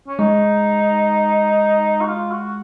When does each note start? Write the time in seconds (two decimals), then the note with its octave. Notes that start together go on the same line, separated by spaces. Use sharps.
0.08 C#4
0.19 G#3 D#4
2.01 F#4
2.08 F4
2.31 F#4